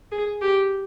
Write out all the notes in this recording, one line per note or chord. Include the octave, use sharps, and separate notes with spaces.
G#4
G4